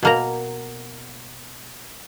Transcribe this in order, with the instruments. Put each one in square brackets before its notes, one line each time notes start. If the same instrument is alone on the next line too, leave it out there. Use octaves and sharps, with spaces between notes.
[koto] B2 A#3 A#5